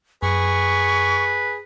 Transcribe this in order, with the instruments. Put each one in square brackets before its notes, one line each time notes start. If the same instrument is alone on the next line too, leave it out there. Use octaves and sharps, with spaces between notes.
[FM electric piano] F#2 [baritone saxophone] G#4 [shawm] B4 [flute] C#6